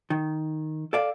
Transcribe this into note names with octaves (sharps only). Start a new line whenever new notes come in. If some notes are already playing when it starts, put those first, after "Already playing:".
D#3
A4 D5 F5